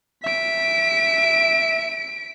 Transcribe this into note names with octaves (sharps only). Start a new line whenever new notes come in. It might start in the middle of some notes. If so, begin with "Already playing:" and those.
E5 B6 D7